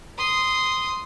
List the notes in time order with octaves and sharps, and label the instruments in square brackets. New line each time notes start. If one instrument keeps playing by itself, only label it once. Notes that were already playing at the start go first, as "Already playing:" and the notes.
[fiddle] C6 D#6